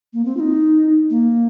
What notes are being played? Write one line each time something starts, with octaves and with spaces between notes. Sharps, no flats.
A#3
C4
F4
D#4
A#3